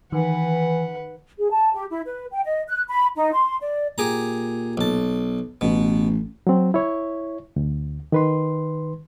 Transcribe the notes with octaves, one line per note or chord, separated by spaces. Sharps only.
D#3 E3 B4 F#5
G#4
A5
G4
E4
B4
G5
D#5
F#6
B5
D#4
C6
D5
A#2 G4 G#4 A#5
B1 A5
A1 B2
F#3 C4
E4 C#5
D2
D#3 B4 C6